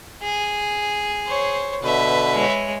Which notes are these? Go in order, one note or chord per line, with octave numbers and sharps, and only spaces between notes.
G#4
C5 C#5
B2 D3 B4 E5
G#3 C#5